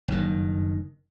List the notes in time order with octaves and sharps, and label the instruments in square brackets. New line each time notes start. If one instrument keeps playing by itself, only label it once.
[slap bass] F#1 G2 D#3